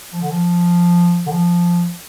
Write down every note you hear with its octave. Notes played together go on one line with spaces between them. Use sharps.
F3
D3
F3
D3
F3